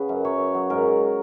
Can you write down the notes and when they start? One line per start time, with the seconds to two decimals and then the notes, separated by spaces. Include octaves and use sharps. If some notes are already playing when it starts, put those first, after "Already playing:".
Already playing: C#3 B3 B4
0.09 F#2
0.25 F#3 C#5
0.39 F#3
0.55 F#3
0.70 G#2 A#4
0.85 F#3